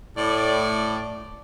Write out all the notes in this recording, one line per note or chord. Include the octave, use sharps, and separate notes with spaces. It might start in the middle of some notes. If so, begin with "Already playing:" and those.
A2 D5